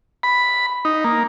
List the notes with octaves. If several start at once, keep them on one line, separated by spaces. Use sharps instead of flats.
B5
D#4
A#3